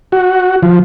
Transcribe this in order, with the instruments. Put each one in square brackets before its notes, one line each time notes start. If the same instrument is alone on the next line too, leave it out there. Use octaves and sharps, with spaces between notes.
[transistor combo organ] F#4
F3